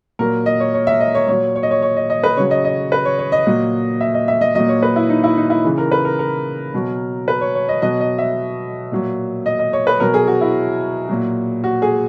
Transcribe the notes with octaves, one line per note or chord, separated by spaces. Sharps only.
A#2 F#3 A#4
D#5
C#5
C#5
E5
D#5
C#5
A#2 F#3 C#5
C#5
D#5
C#5
C#5
D#5
D#5
B4
C#3 F#3 C#5
D#5
D#5
B4
C#5
C#5
D#5
A#2 F#3
E5
D#5
E5
D#5
A#2 F#3 D#5
C#5
B4
E4
D#4
E4
D#4
E4
C#3 E3
A#4
B4
A#4
A#4
B2 F#3
B4
C#5
C#5
D#5
B2 F#3 D#5
D#5
E5
A#2 F#3
D#5
D#5
C#5
B4
B2 F#3 A#4
G#4
F#4
E4
A#2 F#3
F#4
G#4